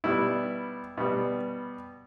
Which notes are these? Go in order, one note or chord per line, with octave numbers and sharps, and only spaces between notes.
B2 G3 B3 E4
B2 G3 B3